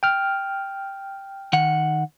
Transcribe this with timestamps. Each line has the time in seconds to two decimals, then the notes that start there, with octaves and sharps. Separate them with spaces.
0.03 G5 F6
1.53 D#3 F#5